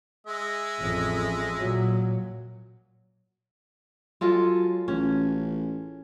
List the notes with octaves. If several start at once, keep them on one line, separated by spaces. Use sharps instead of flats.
G#3 E5
A1 F2
A#2 F#3
F#3 G#3 F4 A4
A1 C#4